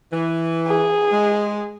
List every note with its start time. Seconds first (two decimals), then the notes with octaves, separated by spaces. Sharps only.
0.13 E3
0.68 G#4
1.12 G#3